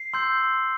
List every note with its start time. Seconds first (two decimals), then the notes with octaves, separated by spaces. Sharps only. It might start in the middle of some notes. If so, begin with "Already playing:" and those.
Already playing: C7
0.14 C6 E6 G6